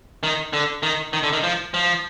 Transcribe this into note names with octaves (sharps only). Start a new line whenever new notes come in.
D#3
D3
D#3
D#3
D3
D#3
F3
F3